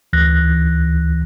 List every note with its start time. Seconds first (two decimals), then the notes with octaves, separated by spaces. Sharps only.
0.13 D2 E3 F#6 A#6